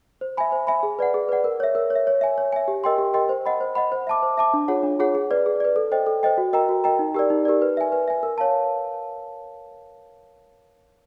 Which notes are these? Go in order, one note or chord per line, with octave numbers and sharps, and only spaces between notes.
C5
E5 G#5 B5
C5
E5 G#5 B5
G#4
B4 D5 F#5
G#4
B4 D5 F#5
A#4
C#5 E5
A#4
C#5
E5
C#5
E5 G#5
C#5
E5 G#5
G4
A#4 D#5 G5 C6
G4
A#4 D#5 G5 C6
C5
D#5 F#5 B5
C5
D#5 F#5 B5
C5
E5 A5 D6
C5
E5 A5 D6
D4
F4 G#4 C#5 F#5
D4
F4 G#4 C#5 F#5
G#4
B4 D5
G#4
B4 D5
A4
C5 D#5 G5
A4
C5 D#5 G5
F#4
A#4 D#5 G5 A#5
F#4
A#4 D#5 G5 A#5
D#4
G4 A#4 D5
D#4
G4 A#4 D5
B4
E5 G#5
B4
E5 G#5
A#4
C#5 F5 A5